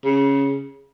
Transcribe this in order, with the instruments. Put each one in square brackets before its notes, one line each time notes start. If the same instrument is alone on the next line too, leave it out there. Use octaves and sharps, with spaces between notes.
[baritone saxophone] C#3